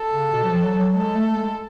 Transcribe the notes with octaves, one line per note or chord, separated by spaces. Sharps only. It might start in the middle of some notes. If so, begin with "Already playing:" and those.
Already playing: A4
C#3
B2
F#3
F3
F#3
F#3
G#3 A4
A3
G#3